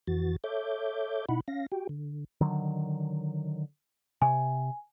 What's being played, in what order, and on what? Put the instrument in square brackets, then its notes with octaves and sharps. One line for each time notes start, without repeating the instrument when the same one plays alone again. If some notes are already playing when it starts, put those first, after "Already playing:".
[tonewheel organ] F2 E3 F#4 A6
A4 C#5 E5 D6 G6
B2 D#4 E4 F#5 B5
C#4 F5 A#6
F#4 G4 G5
D3
[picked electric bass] D3 D#3 F#3
[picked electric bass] C3 [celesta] G#5